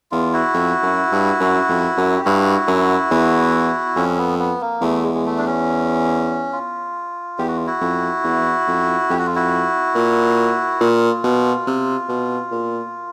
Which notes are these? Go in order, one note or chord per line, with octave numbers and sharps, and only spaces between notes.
E2 F4
E4 F#4
F2
F#2
G2
F#2
F2
F#2
G4
G2 E4 F#4
F#2
E2
F2 C#4
B3
B3
A#3
E2 A3
G#3
G#3
A3
D4
C#4
F4
E2 G4
F#4
F4
E4 F#4
F2
E2
F2
F2 G4
F#4
F4
E4 F#4
A#2
A#2 F4
B2
C3
B2
A#2